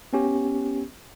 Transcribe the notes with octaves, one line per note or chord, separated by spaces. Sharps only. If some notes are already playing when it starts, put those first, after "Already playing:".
B3 C#4 G4